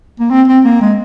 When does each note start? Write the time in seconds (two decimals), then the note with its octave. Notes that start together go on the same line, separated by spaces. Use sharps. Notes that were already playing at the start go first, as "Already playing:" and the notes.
0.20 A#3
0.30 C4
0.48 C4
0.65 A#3
0.81 G#3